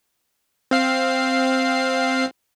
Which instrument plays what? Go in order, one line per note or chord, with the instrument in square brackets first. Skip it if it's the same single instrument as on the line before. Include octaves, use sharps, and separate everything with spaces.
[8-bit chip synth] C4 F5 C7